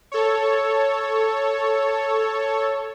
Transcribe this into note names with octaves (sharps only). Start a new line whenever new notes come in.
A4 C#5